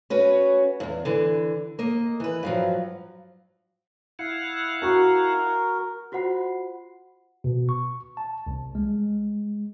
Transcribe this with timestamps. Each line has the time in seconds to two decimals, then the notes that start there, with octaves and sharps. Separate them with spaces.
0.10 C#4 F#4 B4
0.80 E2 G2
1.05 D3 E3
1.79 A#3 D#5
2.20 E3 B4
2.43 G2 F3 F#3
4.19 E4 F5 F#5
4.82 F#4 A#4
6.12 F4 F#4 C5 F#5 B5 C7
7.44 B2
7.69 C#6
8.17 A5
8.47 C2
8.75 G#3